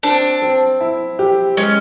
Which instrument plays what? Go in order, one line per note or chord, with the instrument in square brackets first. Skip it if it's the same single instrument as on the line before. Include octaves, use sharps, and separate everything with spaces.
[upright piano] C4 [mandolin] D4
[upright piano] C4
E4
G4
[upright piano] G#3 [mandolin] C#4